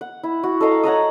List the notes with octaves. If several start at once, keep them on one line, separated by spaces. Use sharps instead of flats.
F#5
E4
F#4
A4 D#5 F5 A#5
C#5 F#5 A#5 D#6